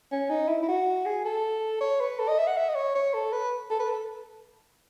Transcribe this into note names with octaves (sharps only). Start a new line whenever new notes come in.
C#4
D#4
E4
E4
F#4
G#4
A4
C#5
B4
A4
D#5
E5
F#5
E5
D#5
C#5
C#5
A4
B4
A4
B4
A4